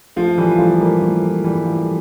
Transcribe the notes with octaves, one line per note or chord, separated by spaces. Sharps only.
F3 A3
E3 G3
F3 A3
G3 A#3
F3 A3
E3 G3
F3 A3